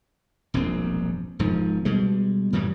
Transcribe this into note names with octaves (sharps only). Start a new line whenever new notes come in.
E1 A#1 G2 C4
E1 G#2 F3
B2 G3 G#3
F#2 A2 E3 G3